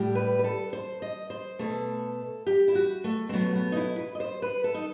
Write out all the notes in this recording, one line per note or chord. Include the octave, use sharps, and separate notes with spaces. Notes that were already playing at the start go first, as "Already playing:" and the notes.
Already playing: A2 G3
B4
B4
A4
C5
D#5
C5
B2 A3 A4
G4
E4
F#4
A3
C4
B2 F#3 A3 B3
B3
D#4
E4
B4
D#5
C5
B4
A4
D#4